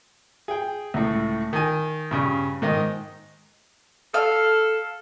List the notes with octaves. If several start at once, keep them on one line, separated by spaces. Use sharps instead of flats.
G#4 G5
C#2 A2
D#3 G#5
G2 C#3
G#2 D#3 D#5
A4 F5